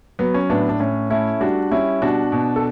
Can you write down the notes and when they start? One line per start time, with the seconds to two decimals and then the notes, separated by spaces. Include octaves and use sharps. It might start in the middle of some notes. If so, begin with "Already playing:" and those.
0.19 F#3 B3
0.34 C#4
0.50 A2 B3 D4
0.69 D4
0.80 A2 C#4
1.10 A3 C#4 E4
1.41 G3 D4 F#4
1.72 G3 C#4 E4
2.02 B2 D4 F#4
2.32 B2
2.56 A4